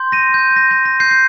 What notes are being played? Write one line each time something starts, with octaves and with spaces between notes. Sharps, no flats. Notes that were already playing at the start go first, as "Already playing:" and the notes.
Already playing: C6 G6
A#6 D#7
G6
A#6
A#6
A#6
G6 C7
C7